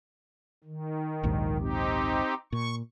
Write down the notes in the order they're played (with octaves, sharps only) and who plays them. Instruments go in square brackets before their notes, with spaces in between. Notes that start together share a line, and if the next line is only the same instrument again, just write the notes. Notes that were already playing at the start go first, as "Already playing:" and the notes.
[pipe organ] D#3
[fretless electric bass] A#1 D#2 G#2
[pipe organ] C4 D#4 G4
[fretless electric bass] A#2 [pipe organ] C#6